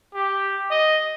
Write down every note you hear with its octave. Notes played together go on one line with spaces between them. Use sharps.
G4
D#5